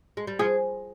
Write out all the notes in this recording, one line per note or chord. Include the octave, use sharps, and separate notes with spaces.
G#3
G3
F3 G#4